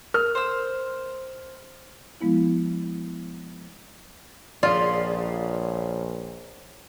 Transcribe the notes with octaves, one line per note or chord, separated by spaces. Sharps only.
A#4 F6
C5 E6
F3 G#3 B3 E4
A#1 C#3 F3 F4 D5